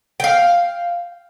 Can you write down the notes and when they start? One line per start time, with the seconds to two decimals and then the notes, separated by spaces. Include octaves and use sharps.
0.20 F5 G5